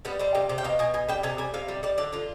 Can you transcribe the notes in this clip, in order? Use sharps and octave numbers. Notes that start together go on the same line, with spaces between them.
G3 B3
G3 C4
C3 G4
C3
G5
B2 F5
B2 G#5
B2 G#5
G3 G5
C3 G#5
G3 G#5
C3 F5
G3
G3 D5
D3 D5
D3 F4